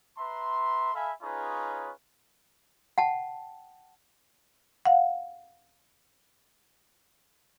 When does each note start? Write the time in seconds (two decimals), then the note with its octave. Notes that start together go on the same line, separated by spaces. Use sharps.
0.18 B4 E5 A#5 C6
0.94 A4 E5 F5 G#5 B5
1.22 C#4 D#4 F4 G#4 B4 C#5
2.98 F#5 G5 A5
4.85 F5 F#5